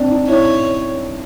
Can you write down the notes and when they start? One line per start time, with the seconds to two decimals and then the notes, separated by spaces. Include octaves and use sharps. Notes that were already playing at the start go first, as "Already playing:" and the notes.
Already playing: C4 D4
0.11 D#4
0.28 E4 C#5